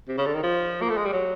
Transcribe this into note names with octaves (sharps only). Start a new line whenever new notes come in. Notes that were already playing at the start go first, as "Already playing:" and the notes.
C3
C#3
D3
D#3
F3
A#3
A3
G#3
G3
F#3